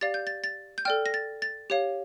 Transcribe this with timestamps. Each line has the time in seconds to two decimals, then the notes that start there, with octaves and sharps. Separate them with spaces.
0.01 G4 D5 F5 A6
0.14 G6
0.27 A6
0.44 A6
0.78 G6
0.85 A4 D5 G5 F6
1.06 A#6
1.14 A6
1.42 A6
1.70 G4 C#5 F5